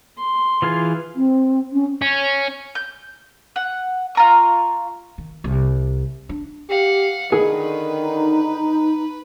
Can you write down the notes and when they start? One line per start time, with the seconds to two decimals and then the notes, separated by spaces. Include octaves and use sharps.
0.17 C6
0.62 E3 F4 G#4
1.16 C4
1.73 C#4
2.01 C#4
2.75 G6
3.56 F#5
4.15 F4 A#5 C#6
5.18 D#3
5.44 C2
6.29 D4
6.70 G4 F5 F#5
7.32 D3 D#3 G#4 B4
7.99 D#4